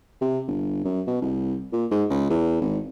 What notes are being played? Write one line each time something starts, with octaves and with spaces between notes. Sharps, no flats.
C3
G1
F#2
B2
C2
A#2
G#2
C#2
E2
G#1